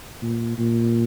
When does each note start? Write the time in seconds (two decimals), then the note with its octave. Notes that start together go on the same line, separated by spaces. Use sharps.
0.22 A#2
0.58 A#2